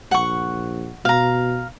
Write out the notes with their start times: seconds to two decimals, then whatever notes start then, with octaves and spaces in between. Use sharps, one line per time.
0.11 A#1 F#5 C#6
1.05 B2 F5 A#5